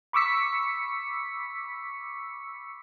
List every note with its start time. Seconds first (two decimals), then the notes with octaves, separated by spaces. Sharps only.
0.13 B5 C#6 D6 E6 B6 C#7